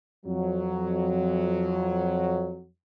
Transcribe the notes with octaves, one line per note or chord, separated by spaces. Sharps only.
F2 F#3